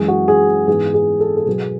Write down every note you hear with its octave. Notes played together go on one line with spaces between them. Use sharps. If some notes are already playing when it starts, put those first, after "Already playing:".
Already playing: F#2 E3 G#3 G#4
F#4
G#4
G#2 E3 B3 G#4
G#4
A4
A4
B2 F#3 B3 G#4